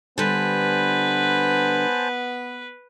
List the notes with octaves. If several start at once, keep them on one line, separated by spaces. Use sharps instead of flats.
D3 G3 B3 B4 C5 G#5 A5